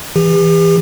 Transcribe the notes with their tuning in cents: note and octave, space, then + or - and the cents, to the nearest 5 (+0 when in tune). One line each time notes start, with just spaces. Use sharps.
E3 +0 G4 +40